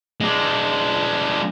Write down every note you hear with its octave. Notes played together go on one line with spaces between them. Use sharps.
G#3 D4